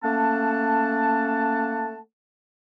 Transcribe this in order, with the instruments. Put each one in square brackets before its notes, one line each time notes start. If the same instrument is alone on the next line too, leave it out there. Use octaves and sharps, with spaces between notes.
[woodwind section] A3 A#3 C#4 F#5 A5